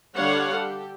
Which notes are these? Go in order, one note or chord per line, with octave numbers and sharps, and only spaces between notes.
D3 G3 D4 C#5 F5 F#5
G4 A4